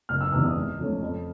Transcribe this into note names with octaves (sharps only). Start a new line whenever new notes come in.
F#1 F6
E6
E2 C3 E3 E6
D#6
G#2
F3 A3 C#4
F2